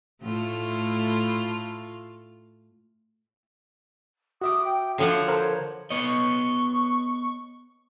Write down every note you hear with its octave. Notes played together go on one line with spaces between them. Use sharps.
A2 A3 F4
F#4 E5 D6 D#6
G5
D3 F3 C#5 F#5
A4 A#4 C5
B3 C#5 D#5 C#6